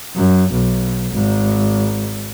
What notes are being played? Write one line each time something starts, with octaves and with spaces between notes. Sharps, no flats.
F#2
B1
G#1